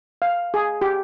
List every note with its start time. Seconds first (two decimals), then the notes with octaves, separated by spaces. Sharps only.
0.22 F5
0.54 G#4
0.81 G4